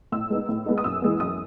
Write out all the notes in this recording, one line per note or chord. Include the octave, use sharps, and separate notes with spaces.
A2 E6
G#3 B3 D#4
A2
G#3 B3 D#4
D#6
F#2 E6
E3 G#3 B3
F#2 D#6